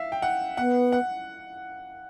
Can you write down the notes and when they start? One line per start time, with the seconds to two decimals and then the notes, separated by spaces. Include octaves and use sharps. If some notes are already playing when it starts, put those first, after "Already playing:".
Already playing: E5 F5
0.12 G5
0.22 F#5
0.57 B3 F#5
0.92 F#5